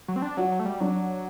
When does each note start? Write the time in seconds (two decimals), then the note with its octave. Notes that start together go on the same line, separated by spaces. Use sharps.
0.08 F#3
0.16 C4
0.22 D4
0.37 F#3 F#4
0.52 F#3
0.59 A3
0.66 G3
0.80 F#3 D4